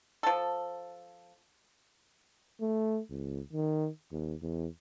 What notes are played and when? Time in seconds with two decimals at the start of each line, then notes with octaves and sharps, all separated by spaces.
0.23 F3 A4
2.61 A3
3.10 C#2
3.53 D#3
4.12 D#2
4.42 E2